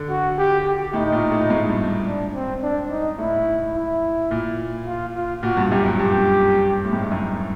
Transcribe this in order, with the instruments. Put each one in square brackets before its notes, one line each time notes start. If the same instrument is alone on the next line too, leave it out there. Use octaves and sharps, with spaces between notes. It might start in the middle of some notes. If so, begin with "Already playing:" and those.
Already playing: [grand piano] D3
[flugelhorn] F#4
G4
G4
[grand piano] A2 [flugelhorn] D#4
[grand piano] A#2
A2
G#2
G2
[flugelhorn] D4
C4
D4
D#4
[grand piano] A2 [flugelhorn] E4
[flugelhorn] E4
[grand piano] A#2
[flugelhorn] F4
F4
[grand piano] A#2 [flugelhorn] F#4
[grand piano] G2
[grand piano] F#2 [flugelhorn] G4
[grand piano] G2
[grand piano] G2 [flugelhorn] G4
[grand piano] A2
G#2
G2
F#2